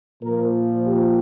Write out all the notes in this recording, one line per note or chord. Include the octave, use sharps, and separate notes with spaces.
A#2 F3 A#4
G4